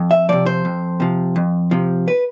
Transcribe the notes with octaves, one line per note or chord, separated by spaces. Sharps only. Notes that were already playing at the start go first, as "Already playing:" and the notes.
Already playing: F2
E5
C3 F3 D5
C5
F2
C3 F3
F2
C3 F3
B4